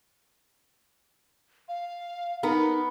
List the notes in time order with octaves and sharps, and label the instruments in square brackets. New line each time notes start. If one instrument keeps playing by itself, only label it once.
[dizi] F5
[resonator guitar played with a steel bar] B3 [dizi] D#4 [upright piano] A#4